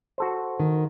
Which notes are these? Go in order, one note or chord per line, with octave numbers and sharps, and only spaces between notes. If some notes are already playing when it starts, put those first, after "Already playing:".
F#4 A4 C5
D#3